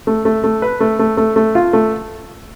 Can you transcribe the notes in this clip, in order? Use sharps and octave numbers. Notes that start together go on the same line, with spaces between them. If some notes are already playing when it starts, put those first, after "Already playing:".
A3
A3
A3
B4
A3
A3
A3
A3
F4
A3